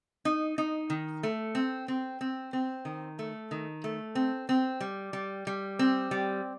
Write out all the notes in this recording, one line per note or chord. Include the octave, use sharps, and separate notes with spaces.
D#4
D#4
D#3
A3
C4
C4
C4
C4
D#3
A3
D#3
A3
C4
C4
G3
G3
G3
C4
G3